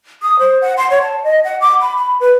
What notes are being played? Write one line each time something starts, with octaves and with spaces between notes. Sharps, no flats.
D#6
C5
F#5
C6
C#5
A5
D#5
F#5
D6
B5
B5
B4